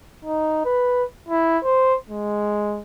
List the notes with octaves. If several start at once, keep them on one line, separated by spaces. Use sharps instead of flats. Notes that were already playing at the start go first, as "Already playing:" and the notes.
D#4
B4
E4
C5
G#3